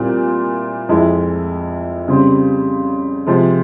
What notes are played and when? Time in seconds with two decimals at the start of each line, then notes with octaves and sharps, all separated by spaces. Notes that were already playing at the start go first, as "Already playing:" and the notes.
Already playing: A#2 G3 C4 E4
0.89 F2 E3 G#3 E4
2.08 C#3 G3 C4
3.26 C3 F3 G#3